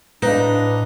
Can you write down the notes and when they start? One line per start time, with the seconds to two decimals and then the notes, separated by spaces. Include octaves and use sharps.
0.22 A2 D4 D#4 B4 F5